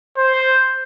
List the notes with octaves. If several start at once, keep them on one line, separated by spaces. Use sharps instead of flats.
C5